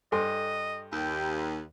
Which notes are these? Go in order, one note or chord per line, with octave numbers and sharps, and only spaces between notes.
G2 A4 C5 D#5 G#5 C6
D#2 G5